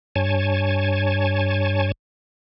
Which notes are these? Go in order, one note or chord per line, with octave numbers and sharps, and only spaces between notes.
G2 C#5 G#5 A5